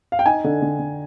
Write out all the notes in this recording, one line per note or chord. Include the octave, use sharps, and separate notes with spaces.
F5
G5
D#4 G#5
D3
D3
D3